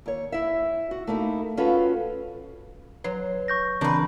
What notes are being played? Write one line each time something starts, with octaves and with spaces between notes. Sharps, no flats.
D#2 C#5
E4 E5
F#4
A3 A#3 D#4 E4
C#4 F4 F#4 A4 B4
F#3 B4 C6
C#6 G6 A#6
A#2 C#3 E3 C4 D4 A#4 B4